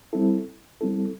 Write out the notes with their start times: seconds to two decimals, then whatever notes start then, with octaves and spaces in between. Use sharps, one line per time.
0.13 G3 C4 E4 A4
0.81 G3 C4 E4 A4